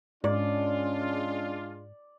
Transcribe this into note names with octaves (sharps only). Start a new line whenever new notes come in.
G#2 G#3 C#4 D4 F4 D5